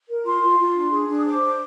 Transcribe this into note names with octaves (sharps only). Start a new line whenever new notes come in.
A#4
F4 C6
F4
F4
D4
G#4
D4
D#6
C5 D6
D4